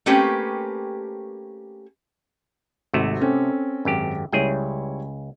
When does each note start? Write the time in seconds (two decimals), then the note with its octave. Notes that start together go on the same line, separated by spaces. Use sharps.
0.06 A3 A#3 C4 C#4 G4 B4
2.93 G#1 C3 A3 F#4
3.21 C4 C#4 A4
3.85 G#1 F#2 G4
4.32 C#2 G3 E4 G#4 C#5 G5